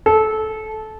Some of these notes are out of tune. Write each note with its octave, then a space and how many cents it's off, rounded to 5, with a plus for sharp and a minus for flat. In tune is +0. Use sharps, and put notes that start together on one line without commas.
A4 -20